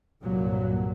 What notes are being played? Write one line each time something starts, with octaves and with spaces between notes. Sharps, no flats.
C2 G2 A#2 F#3